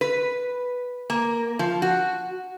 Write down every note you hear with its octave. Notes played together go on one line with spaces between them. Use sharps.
B4
A#3
F3
F#4